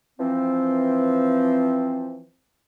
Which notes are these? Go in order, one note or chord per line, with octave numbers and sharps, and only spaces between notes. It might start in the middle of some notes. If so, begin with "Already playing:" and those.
E3 F3 C4